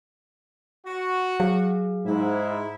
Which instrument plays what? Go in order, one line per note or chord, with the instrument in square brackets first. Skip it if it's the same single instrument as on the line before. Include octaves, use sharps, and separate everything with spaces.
[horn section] F#4
[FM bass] F#3 [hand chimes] G#4 F5
[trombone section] G#2 [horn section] E4